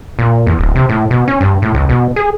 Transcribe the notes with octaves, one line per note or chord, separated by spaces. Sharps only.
A#2
E2
D1
C3
A2
B2
C#4
G2
A2
C#2
B2
G#4